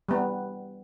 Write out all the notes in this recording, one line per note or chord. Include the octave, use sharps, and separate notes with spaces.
G3 B3